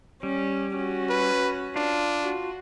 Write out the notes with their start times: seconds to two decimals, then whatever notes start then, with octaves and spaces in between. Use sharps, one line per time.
0.23 G3 C#4
0.76 C#4 F#4
1.10 B4
1.76 D4 F4
2.22 F#4